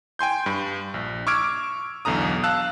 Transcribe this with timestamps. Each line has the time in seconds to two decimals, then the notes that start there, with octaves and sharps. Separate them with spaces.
0.19 G5 G#5 C6 G6
0.46 G2 B5
0.94 A#1
1.27 C#6 D6 E6 F6 G#6 D7
2.05 B1 E2 D3 A#5 D#6
2.44 F5 A5 E6 F#6